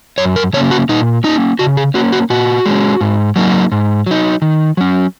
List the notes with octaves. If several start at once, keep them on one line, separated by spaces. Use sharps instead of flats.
F#2 C#5
A#4
C#3 A#3 C#4 C#5
F#4
A#2 D#4
A#3 C#4 D#4
C#3 F#4
G#4
A#3 C#4 F#4
F#4
A#2 F#4
G#3 C#4
G#2
F#3 A#3 D#4
G#2
F#3 D#4
D#3
F#3 C#4